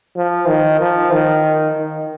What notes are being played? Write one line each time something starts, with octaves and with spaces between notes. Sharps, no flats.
F3
D#3
F3
D#3
D#3